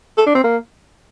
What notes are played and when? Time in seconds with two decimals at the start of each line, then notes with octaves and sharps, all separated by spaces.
0.17 A4
0.26 D4
0.35 C4
0.44 A#3